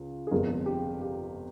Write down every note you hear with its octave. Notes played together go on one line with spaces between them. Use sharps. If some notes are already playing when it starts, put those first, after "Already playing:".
Already playing: C#2
G#4
G1 F2 C3 F3 G#3 A#4
G4
G4